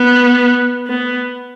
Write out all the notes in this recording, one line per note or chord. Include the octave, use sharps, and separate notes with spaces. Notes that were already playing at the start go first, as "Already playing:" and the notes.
Already playing: B3
B3